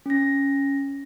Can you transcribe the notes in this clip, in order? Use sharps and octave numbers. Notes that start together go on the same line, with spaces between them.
C#4 A#6